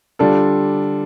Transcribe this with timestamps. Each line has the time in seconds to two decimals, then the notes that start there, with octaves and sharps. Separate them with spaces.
0.19 D3 G3 D4 F4 A4